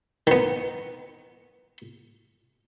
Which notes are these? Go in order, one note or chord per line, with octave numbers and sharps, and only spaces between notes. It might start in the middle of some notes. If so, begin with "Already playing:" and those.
D#3 B3